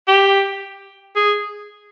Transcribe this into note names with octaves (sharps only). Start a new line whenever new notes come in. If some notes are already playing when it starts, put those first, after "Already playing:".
G4
G#4